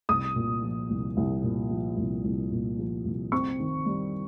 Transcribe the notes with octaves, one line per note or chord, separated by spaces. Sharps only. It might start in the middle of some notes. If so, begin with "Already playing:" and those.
C2 D#6
A#2
F3
C2
C2
A#2
F3
C2
C2
A#2
F3
C2
C4 C#6
D#3
G3